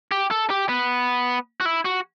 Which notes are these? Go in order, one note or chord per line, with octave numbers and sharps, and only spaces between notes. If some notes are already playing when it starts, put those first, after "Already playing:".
G4
A4
G4
B3
F#4
E4
F#4